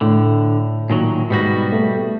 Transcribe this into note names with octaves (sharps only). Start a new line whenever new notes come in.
A2 D3
A#2 D#3 F#3
G#2 B2 G3 F#4 A#6
A3